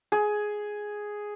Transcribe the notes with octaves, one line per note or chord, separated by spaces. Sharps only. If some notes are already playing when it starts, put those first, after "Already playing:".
G#4